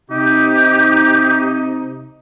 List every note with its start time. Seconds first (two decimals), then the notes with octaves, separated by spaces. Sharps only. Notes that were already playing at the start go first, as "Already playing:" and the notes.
0.11 C3 D#4 G4